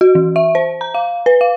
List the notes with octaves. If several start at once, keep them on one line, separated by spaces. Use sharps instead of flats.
F#4
E3
E5
C5
A#5
F5
B4
F5